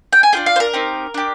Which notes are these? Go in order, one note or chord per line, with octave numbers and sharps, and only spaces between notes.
G5
G#5
D4 F4 G#4 G5
F5
C5
A#4
C4 D#4 G4
D4 G4